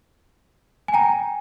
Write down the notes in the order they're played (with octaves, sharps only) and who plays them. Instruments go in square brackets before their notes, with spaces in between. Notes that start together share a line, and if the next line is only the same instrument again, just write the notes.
[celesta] G#5
G5 A#5